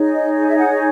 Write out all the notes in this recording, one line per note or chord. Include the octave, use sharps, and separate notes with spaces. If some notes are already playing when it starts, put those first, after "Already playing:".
Already playing: D#4 G#4 C#5
D#5
D#5
E5
F#5